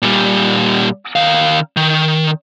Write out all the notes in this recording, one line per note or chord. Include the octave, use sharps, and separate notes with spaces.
A#2 G3
D#3 F5
D#3